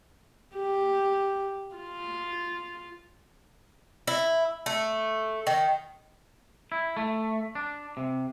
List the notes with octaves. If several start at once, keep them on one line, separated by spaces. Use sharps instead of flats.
G4
F4
E4
A3
D#3
E4
A3
D4
C3